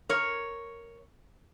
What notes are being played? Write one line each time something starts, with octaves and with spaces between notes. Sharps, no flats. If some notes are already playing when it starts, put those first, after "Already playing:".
A#4 C#5